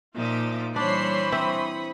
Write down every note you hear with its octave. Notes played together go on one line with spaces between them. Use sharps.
A#2 F3 D#4 F4 E5 D6
E3 G3 D4 C5 C#5 B5 C7
C4 E4 C#6 D#6